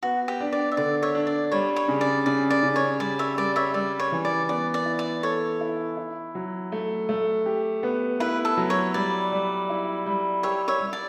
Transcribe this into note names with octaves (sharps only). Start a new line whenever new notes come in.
B3 F#4
G4
D4
D5
E5
D3 D5
C#5 E5
D4
D5
G3 C#5
C#5
C#3
D5
C#3 D5
D5
C#3
C#5
G3 D5
C#5 E5
G3 D5
C#5 E5
G3 D5
C#5
E3
D5
B3 D5
D5
E4
D5
A4 C#5
E4
E4
F#3
A3
A3
G4
B3
E4 B4
A4
F#3
C#5
G3 D5
G3
E4
G3
G4 C#5 E5
C#5 E5
G3
D5